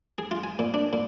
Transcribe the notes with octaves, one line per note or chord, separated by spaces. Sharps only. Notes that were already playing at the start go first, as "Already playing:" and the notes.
G#4
F4
G#5
A#2
D4
A#2